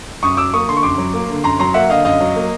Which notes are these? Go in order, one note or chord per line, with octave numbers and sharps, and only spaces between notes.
F#2 C#6 D#6
F#3 D6 E6
A#3 C#6 D#6
D3 C6
C#6
F#2 C6 D6
F#3
A#3
D3
F#2 A#5 C6
F#3 A#5 C6
A#3 E5 F#5
D3 D#5 F5
F#2 D#5 F5
F#3
A#3